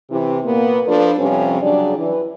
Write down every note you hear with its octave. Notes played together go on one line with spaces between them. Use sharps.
C3 E3
A#2 A#3 B3
F3 D4 A4 B4 D5
F2 C3 F3 G3 C#4
C#3 F#3 G3 D4 G#4 D5
E3